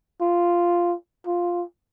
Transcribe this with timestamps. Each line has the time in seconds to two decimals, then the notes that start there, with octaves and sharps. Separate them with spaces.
0.21 F4
1.27 F4